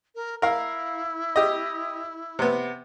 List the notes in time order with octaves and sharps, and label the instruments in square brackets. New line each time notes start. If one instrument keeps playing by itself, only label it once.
[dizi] A#4
[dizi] E4 [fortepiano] A#4 F5
[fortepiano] G4 D#5
C3 B3